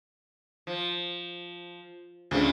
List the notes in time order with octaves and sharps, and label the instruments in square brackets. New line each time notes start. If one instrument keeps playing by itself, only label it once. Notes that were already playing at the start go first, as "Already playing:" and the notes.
[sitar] F3
[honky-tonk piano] D2 C#3 [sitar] G2 F3